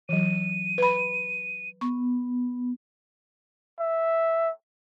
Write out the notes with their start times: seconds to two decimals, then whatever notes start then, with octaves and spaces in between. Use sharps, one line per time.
0.09 E3 F#3 D#7
0.78 B4 B5
1.81 B3 C#6
3.80 E5